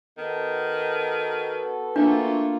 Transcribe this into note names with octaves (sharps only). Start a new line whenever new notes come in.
D#3 B3 F#4 A4
A3 A#3 D4 F4